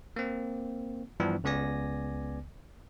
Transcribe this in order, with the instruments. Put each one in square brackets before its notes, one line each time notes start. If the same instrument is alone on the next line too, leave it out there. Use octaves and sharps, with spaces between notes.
[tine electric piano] A#3 C4
G2 E3 F3 B3 D4
C#2 C#3 B3 D5 G#5 A#6